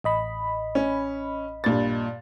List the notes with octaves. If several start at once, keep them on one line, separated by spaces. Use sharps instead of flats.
A1 D#5 B5
C#4
G2 A#2 A6